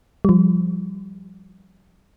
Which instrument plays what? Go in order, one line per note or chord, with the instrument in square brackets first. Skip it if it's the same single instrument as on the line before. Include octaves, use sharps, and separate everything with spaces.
[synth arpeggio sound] F3 G3